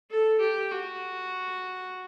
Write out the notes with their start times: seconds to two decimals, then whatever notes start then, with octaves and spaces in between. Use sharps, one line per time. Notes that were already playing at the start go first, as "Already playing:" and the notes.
0.11 A4
0.40 G4
0.71 F#4